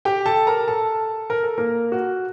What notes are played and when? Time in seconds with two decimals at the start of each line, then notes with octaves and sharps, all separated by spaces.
0.05 G4 G5
0.26 A4 A5
0.47 A#4 A#5
0.68 A4 A5
1.30 A#4
1.43 A4
1.58 A#3 A#4
1.92 F#4